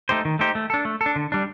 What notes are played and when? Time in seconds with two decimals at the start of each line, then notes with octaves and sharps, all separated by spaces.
0.09 A3 D#4 G4 C5
0.25 D#3
0.39 A3 D#4 G4 C5
0.55 A3
0.70 D4 A4
0.85 A3
1.01 A4
1.06 D4
1.16 D3
1.32 G3 D4